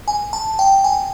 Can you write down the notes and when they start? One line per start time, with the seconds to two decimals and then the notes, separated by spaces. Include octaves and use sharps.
0.08 G#5
0.33 A5
0.59 G5
0.84 G#5